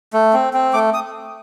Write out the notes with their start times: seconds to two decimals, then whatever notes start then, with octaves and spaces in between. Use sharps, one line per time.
0.13 A3
0.33 C4
0.53 C4
0.73 A3 D6
0.94 D#6